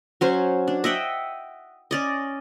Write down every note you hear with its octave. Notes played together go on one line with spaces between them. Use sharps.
F#3 C#4 C5
D4
D#5 E5 F#5 G5
C#4 D5 D#5